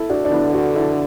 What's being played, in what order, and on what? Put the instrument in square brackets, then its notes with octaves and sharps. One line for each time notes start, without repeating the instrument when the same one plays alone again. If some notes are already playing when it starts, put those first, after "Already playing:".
Already playing: [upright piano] E4 A4
D4 F#4
D4
[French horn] D3 [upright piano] B3 E4
[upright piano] D4 F#4
E4 A4